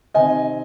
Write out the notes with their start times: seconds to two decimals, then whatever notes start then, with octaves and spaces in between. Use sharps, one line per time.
0.14 C3 D#3 C4 D#5 G#5